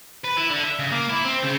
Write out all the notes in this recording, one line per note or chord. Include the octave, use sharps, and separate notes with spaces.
B4
E4
D3
E5
C#3
A#3
E4
C4
C#3